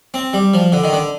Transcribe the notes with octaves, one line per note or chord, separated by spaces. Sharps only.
C4
G3
F3
D3
D#3
D3